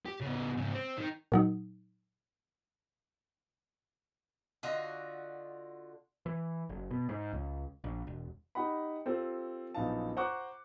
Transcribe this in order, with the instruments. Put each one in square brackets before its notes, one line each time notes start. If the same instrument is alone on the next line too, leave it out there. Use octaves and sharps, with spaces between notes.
[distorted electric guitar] G4
C#3 B3
G#2 C#3
C4
D#3
[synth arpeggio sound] A#2 F#3 D#4
[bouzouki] D3 F4 F#4 D#5
[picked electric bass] E3
F#1
B2
G#2
C#2
A#1
E1
[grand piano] D#4 G4 D#5 F#5 B5
C4 F4 G4 A4 C5
A#1 F#2 B3 D#4 F5 A5
C5 F#5 A#5 C#6 D6 F#6